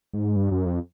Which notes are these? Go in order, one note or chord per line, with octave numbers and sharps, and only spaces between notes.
G#2
G2
F#2
F2